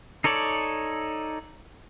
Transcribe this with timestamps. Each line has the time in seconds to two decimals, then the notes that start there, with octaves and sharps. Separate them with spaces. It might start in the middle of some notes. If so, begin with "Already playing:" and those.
0.24 D#4 A4 C#5 D5